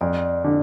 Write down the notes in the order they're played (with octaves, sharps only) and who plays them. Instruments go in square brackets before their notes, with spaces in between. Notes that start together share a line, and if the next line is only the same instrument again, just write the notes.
[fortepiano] F2 [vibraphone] D5
[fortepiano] D3